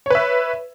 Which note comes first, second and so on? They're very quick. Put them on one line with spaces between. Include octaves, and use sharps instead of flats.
C#5 B4 E5